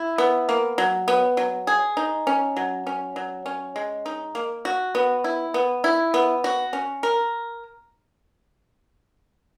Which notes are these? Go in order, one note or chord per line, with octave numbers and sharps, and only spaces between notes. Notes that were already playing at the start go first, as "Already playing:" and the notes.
Already playing: E4
B3
A#3
F#3
B3
F#3
G#4
D#4
C#4
F#3
C#4
F#3
C#4
G#3
D#4
A#3
F#4
B3
E4
B3
E4
B3
F#4
C#4
A#4